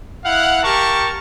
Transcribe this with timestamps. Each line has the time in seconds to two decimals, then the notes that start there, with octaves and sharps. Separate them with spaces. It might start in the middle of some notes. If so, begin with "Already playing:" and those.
0.25 E4 F5 F#5
0.62 G4 A#4 A5 C#6